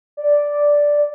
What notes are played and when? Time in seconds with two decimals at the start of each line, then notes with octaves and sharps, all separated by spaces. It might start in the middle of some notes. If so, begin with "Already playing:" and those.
0.17 D5